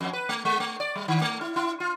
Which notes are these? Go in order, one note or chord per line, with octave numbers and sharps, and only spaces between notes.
F2
B4
A3
G#3
A3
D5
G3
D#3
A3
E4
E4
F4